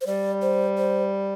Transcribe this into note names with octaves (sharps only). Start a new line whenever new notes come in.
C5
G3 D5
C5
C5